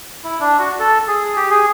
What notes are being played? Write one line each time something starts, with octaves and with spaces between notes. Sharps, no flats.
E4
D4
F#4
A4
G#4
G4
G#4